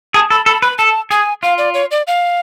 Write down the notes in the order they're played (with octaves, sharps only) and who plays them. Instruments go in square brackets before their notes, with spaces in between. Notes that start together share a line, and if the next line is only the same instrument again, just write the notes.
[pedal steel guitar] G#4 [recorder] A5
[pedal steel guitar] A4 [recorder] B5
[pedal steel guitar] A4 [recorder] B5
[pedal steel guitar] B4 [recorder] B5
[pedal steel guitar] A4 [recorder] A5
[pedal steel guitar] G#4 [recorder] G#5
[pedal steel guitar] F4 [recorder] F5
[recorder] D5
C#5
D5
F5